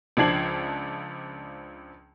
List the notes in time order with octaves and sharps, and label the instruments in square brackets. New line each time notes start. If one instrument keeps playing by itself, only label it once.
[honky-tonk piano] C#2 F3 D4 G#6 C7 F#7